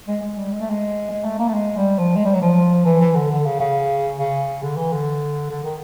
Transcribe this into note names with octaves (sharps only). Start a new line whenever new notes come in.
G#3
G#3
G3
G#3
A3
G#3
G#3
A3
A#3
A3
G#3
G3
F3
G#3
G3
F#3
F3
E3
E3
D3
D3
C#3
C#3
C#3
D3
E3
D3
D3
D#3